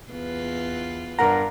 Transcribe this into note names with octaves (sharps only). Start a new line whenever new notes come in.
E2 F4 B4
G2 A#4 F#5 A#5